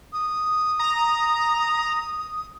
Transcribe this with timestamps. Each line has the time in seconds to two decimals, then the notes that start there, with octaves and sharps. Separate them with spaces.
0.13 D#6
0.79 A#5